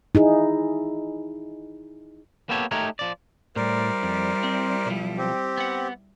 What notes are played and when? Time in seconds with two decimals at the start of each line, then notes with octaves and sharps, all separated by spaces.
0.15 D#4 E4 G#4
2.49 A#3 B3 G4 A4 C#5
2.71 A3 D#4 G4 A#4 C#5
2.99 F3 D5
3.56 A2 G3 E4 A#4 C5 D5
4.03 F2
4.44 C4
4.86 B1 F3
5.18 C4 G4
5.57 B3 F#5